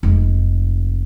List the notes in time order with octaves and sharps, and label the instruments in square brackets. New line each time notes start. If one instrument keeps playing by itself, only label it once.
[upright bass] F1 G#3